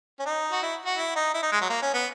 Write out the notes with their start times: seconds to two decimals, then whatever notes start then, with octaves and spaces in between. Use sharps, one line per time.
0.20 C#4
0.26 D#4
0.52 F#4
0.62 E4
0.85 F#4
0.97 E4
1.16 D#4
1.34 E4
1.43 D#4
1.52 G#3
1.61 F#3
1.70 A#3
1.82 C#4
1.94 B3